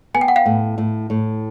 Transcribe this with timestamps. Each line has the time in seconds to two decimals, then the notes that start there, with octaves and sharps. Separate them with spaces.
0.14 B3 G#5
0.21 G5
0.28 F#5
0.36 F5 G5
0.46 A2
0.78 A2
1.10 A2